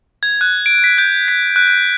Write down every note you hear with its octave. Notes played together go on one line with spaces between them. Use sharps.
G#6
F#6
D7
B6
G6
B6
F#6
F#6